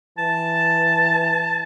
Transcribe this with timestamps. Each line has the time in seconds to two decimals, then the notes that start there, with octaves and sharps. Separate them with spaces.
0.18 E3 A5